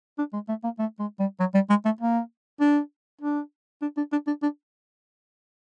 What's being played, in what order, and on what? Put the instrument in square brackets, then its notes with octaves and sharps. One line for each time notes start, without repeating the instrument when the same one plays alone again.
[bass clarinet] D4
G#3
A3
A#3
A3
G#3
G3
F#3
G3
G#3
A3
A#3
D4
D4
D4
D4
D4
D4
D4